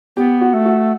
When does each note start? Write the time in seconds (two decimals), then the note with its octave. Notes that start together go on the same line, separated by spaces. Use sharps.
0.17 B3 G4
0.41 F#4
0.53 A3
0.65 F#4